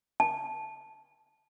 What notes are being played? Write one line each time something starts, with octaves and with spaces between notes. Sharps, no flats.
A5